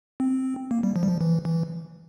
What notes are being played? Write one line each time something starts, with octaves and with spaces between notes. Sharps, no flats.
C4
A#3
G3
F3
G3
F3
E3
E3